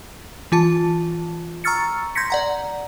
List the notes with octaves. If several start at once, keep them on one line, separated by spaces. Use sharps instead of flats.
E3 F4 A5
A#5 C#6 E6 F6 A6 C#7
C6 G6 G#6 A#6 B6 C#7
D5 F#5 A#5